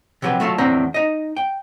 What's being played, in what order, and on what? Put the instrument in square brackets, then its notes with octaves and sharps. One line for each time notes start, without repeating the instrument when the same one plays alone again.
[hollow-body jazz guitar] C3 F3 F#3 G4 B4
F#3 A3 F4 A4
E2 A2 C4 D4 A#5
D#4 D#5
G5